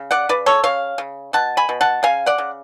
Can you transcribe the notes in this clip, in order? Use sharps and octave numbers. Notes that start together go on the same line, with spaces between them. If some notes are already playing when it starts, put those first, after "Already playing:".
Already playing: C#3
D5 F#5
C#3 B4 D5
A4 C#5
C#3 C#5 F5
C#3
B2 F#5 A5
G#5 B5
B2
F#5 A5
C#3 F5 G#5
D5 F#5
C#3